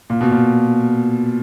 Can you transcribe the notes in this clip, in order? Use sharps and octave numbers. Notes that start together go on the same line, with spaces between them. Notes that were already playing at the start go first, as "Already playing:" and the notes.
A#2
B2
A#2